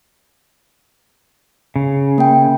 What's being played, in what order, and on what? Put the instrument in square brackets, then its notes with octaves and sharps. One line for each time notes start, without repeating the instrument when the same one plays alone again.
[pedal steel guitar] C#3
[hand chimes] A#3 G5